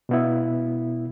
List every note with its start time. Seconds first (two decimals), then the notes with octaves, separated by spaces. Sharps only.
0.09 B2 B3 E4